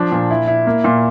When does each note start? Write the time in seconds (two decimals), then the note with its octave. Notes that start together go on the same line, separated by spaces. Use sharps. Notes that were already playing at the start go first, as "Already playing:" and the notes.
Already playing: F3 D4
0.12 A#2
0.31 E4
0.48 E4
0.67 A#3
0.84 A#2